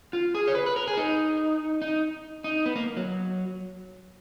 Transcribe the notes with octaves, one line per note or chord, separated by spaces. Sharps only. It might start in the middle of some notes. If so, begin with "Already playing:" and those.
F4
G#4
C#5
B4
B4
A#4
G#4
D#4
D#4
D#4
B3
A#3
F#3